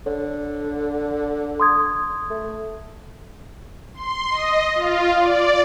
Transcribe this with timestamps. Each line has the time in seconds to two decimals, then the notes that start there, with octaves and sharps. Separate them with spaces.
0.06 D3 C#5
1.60 C6 D#6 G#6
2.30 A3
3.94 C6
4.31 D#5
4.74 F4
5.17 D5